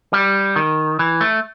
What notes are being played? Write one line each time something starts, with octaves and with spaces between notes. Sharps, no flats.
G3
D#3
E3
A3